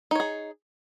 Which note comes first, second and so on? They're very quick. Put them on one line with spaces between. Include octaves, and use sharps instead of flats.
D#4 C#5 G#4